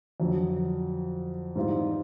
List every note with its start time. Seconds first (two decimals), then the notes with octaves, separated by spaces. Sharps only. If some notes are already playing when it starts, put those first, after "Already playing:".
0.20 F2 D3 F#3
1.56 G#2 E3 G3 C4 F4